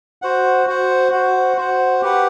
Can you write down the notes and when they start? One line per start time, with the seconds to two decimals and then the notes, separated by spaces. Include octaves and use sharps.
0.22 F#4 C5 F#5
0.67 F#4 C5 F#5
1.12 F#4 C5 F#5
1.57 F#4 C5 F#5
2.02 G4 B4 F#5